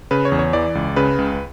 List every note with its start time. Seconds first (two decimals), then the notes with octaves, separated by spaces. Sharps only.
0.11 C#3 B4
0.25 C#5
0.32 E2
0.39 C#5
0.53 E3 D5
0.75 C#2
0.96 C#3 B4
1.18 C#2